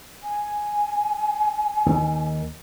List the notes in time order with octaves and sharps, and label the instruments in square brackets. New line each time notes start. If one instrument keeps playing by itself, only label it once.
[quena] G#5
[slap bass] D#2 D#3